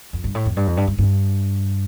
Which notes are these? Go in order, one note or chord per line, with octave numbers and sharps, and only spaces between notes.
F2
G2
A2
F2
G2
F2
G2
G2
G2